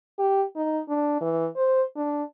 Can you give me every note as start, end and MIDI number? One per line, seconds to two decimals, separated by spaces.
0.19 0.44 67
0.56 0.80 63
0.89 1.18 62
1.21 1.48 52
1.56 1.82 72
1.96 2.23 62